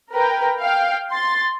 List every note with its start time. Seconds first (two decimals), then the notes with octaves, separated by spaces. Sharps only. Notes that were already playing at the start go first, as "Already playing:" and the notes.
0.13 A#4 B4 G5
0.61 F5 G5
1.11 C6 A6